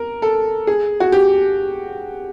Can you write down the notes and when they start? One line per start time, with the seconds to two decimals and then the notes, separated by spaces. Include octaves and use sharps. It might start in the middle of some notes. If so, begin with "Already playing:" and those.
Already playing: A#4
0.22 A4
0.67 G#4
1.00 F#4
1.12 G4